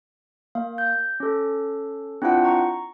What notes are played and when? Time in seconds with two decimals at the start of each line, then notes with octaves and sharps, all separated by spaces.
0.55 A#3 F5
0.78 G6
1.20 C#4 A4
2.22 C4 D4 E4 F4 F#5 G5
2.45 A#5 C#6